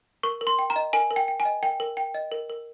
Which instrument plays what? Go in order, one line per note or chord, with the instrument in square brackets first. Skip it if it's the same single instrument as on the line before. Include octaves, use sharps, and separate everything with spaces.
[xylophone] A#4 C#6
A#4
C6
G5
A#5
D#5
A#4 G#5
A#4
G5
G5
G#5
D#5
A#4 G5
A#4
G5
D#5
A#4
A#4